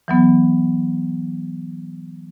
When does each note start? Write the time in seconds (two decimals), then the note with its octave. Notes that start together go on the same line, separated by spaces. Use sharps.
0.08 E3 F#3 B3